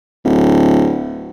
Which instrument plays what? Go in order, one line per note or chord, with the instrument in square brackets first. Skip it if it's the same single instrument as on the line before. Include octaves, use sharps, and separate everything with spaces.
[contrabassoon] D1